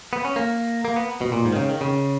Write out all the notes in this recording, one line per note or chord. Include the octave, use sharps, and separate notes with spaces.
B3
C#4
A#3
A#3
B3
B2
A#2
G#2
D#3
C#3
D#3
C#3